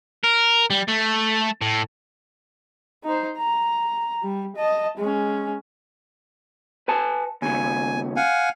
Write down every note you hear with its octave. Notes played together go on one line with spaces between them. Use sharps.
A#4
G3
A3
A2
D#4 C5
A#5
G3
D#5 A5
G#3 C#4
B4 G#5 A5
D#2 C#3 G#5
F5 F#5 G#5